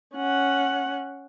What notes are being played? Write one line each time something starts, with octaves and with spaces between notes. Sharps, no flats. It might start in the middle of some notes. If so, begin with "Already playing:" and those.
C#4 F#5